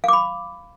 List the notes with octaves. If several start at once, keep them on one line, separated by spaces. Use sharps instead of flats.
F5 B5 D6